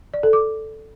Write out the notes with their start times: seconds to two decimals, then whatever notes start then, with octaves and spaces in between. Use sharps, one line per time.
0.14 D5
0.23 A4
0.33 D6